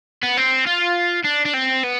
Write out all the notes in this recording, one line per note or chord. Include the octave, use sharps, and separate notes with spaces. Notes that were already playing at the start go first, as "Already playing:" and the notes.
B3
C4
F4
D4
D4
C4
B3